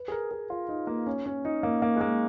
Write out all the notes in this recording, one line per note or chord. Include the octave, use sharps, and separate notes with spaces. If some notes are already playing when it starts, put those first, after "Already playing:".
Already playing: B4
G#4
A#4
G#4
F4
D#4
A#3
C#4
C#4
D#4
A#3
A#3
G#3
A#3